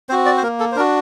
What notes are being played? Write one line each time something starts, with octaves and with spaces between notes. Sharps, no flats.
C4 F#4 C5
D5
C5
A#3 A#4
A4
C5
D4 F#4 A#4